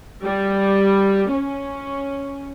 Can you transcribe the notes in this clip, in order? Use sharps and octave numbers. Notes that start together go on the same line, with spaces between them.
G3
C#4